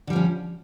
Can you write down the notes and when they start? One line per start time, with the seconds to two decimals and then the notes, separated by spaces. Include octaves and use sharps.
0.07 D3
0.10 G3
0.13 F3
0.16 C#4